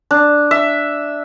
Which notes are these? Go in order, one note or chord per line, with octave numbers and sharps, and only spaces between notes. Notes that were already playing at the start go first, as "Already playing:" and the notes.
D4
E5